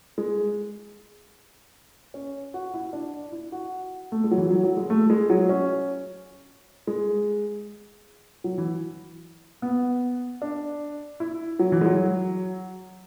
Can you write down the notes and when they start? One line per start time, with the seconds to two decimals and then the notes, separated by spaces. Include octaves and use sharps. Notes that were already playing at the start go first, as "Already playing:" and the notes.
0.18 G#3
2.14 C#4
2.54 F#4
2.74 E4
2.93 D4
3.32 E4
3.52 F#4
4.12 A3
4.24 G#3
4.31 F#3
4.38 E3
4.51 F#3
4.64 F#3
4.77 G#3
4.90 A3
5.10 G#3
5.30 F#3
5.49 C#4
6.87 G#3
8.44 F#3
8.58 E3
9.62 B3
10.42 D4
11.20 E4
11.59 F#3
11.72 E3
11.81 G#3
11.86 F#3